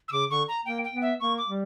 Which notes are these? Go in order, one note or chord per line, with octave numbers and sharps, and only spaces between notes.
E6
C#3 D6
D3 C#6
A#5
A#3 G5
G5
B3
E5
A#3 C#6
D6
G3